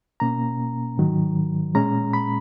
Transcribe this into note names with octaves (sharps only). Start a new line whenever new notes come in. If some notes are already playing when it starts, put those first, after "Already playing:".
B2 A#3 C#4 A#5
G#2 D#3 F#3
A#2 G#3 C#4 A#5
B5